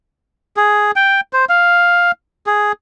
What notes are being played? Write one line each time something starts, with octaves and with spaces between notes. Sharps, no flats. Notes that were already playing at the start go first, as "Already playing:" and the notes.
G#4
G5
C5
F5
G#4